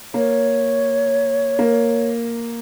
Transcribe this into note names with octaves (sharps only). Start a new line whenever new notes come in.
A#3 C#5
A#3